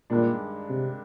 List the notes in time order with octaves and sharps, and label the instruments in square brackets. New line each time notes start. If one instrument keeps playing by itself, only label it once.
[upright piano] G2 D#3 G#3 D4 [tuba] A#2
[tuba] C3